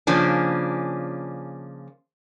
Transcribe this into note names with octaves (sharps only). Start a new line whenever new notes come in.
C#3 F3 A#3 C#4 D4